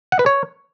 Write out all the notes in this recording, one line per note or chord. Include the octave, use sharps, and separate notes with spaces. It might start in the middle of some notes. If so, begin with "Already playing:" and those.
F#5
B4
C#5